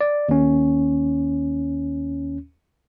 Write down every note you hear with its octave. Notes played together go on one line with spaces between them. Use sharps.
D5
D#2 C#4